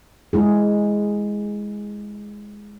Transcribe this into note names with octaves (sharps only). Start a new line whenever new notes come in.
G#3 E4 G#4